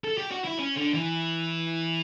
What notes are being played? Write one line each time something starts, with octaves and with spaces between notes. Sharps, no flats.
A4
G4
F#4
E4
C#4
D3
E3